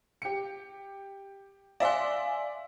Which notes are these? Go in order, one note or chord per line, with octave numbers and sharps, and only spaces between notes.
G4 C#7
D5 E5 F5 G#5 C6